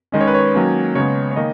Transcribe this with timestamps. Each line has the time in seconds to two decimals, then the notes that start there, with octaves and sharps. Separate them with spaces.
0.12 D#3 G#3 C#4 D#5
0.21 C#5
0.27 B4
0.34 C#5
0.54 D#3 F#3 A#3 C#4
0.95 C#3 G#3 B3 C#5
1.31 C#5
1.36 D#3 A#3 D#5